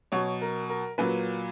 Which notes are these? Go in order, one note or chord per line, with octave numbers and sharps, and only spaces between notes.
B2 F#3 C#5
A#4
A#4
A#2 F#3 B4